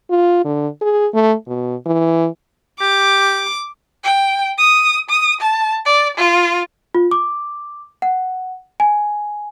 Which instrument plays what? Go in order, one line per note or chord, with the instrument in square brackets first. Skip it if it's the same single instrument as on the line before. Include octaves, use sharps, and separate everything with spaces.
[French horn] F4
D3
G#4
A3
B2
E3
[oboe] G4 [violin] D6
[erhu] G5
D#6
D#6
A5
D5
F4
[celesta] F4
D6
F#5
G#5